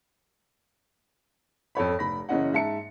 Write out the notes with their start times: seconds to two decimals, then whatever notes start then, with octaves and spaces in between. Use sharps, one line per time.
1.75 F2 A4 C#5 B5
1.99 F1 B5 A#6
2.29 F#1 E3 C#4 D#5 F#5
2.53 G#2 E5 A5 C#7